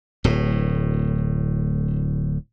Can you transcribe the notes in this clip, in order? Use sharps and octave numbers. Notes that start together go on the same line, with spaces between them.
D1 A2